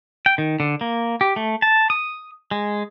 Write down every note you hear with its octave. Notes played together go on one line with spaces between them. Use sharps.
G5
D#3
D3
A#3
G4
A3
A5
D#6
G#3